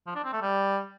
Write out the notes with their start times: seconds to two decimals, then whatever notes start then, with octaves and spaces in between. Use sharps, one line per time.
0.06 F3
0.15 D4
0.24 C4
0.33 A3
0.41 G3